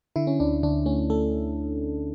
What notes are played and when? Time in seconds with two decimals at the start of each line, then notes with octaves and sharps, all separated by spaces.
0.16 D3 E4
0.27 C#4
0.40 D2 D4
0.63 D2 D4
0.86 A3 C#4
1.10 A3 A4